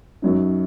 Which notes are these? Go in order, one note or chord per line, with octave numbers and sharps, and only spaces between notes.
F#2 F#3 D#4